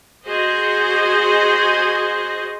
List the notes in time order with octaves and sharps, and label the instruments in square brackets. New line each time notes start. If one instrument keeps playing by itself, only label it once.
[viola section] F#4 G#4 C5 D#5